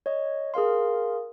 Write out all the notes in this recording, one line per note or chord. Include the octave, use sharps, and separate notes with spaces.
C#5 D#5
G#4 A#4 F5 C6